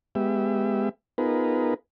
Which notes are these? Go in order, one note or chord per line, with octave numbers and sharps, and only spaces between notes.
G#3 B3 G4 E5
B3 D#4 F4 G#4 A#4 B4